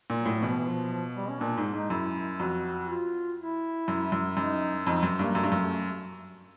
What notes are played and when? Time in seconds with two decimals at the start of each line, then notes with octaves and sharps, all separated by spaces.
0.10 A#2
0.18 F#3
0.25 A2
0.42 B2 E3
0.50 F3
0.56 E3
0.67 F3
0.92 F3
1.16 G3
1.29 C#4
1.41 A#2 D4
1.57 G#2
1.74 G#2 D#4
1.90 F#2 E4
2.40 F2 F#4
2.88 F4
3.39 E4
3.88 F#2
4.12 F#2
4.37 F#2 D#4
4.86 F2 D#4
5.03 F#2
5.19 G2 A#3
5.35 F#2 A3
5.44 G2
5.52 F#2
5.60 A3